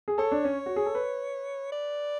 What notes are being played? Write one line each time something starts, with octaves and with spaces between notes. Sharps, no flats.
G#4
A4 C#5
D4
C#4
F#4
G#4
A4
B4
D5